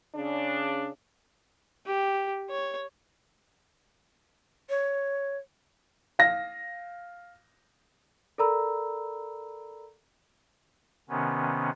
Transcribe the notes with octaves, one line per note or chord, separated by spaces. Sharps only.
C#3 D4
G4
C#5
C#5
F5 A#6
A4 A#4 D5 A#5 B5 E6
C3 D#3 B3 C#4